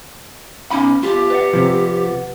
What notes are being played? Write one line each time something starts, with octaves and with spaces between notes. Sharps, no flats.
B2 C#4 D#4 B5
E2 F4 G4
B4 D5 F#5
C3 F3